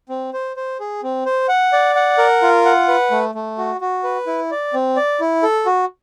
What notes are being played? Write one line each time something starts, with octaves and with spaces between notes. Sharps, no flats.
C4
C5
C5
G#4
C4
C5
F#5
D5
F#5
A#4
F4
F#5
B4
A3
A3
F#4
F#4
B4
E4
D5
C4
D5
E4
A4
F#4